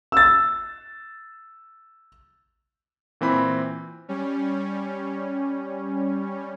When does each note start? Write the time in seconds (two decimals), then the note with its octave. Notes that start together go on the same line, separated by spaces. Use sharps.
0.12 E6 A6
3.21 A#2 E3 C4 B5
4.08 G3 C#4